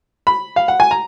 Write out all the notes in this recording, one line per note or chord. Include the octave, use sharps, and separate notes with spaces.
B5
F5
F#5
G#5
A#5